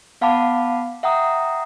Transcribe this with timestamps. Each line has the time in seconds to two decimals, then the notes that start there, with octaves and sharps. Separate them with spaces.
0.21 B3 F5 F#5 A5 B5 D6
1.03 E5 F#5 G5 A#5 D#6